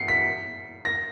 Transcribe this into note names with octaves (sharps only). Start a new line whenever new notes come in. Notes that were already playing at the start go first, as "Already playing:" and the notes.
Already playing: C7 C#7
B6
A#6